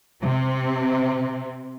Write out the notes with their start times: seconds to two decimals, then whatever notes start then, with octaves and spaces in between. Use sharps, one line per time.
0.21 C3 C4